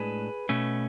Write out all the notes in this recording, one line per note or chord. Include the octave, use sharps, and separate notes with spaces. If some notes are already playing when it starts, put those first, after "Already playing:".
Already playing: A2 G#3 D4 G#4 B4
B2 A3 C#4